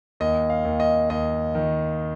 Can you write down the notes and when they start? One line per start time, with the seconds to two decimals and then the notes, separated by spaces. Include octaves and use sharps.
0.20 D#2 D#5
0.50 F5
0.65 D#2
0.80 D#5
1.10 D#2 D#5
1.55 D#3